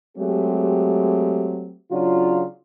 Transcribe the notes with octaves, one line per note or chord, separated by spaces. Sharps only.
F#3 G#3 A3 C4 G4
C#3 F#3 D4 F4